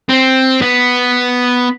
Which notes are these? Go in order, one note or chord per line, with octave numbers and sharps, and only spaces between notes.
C4
B3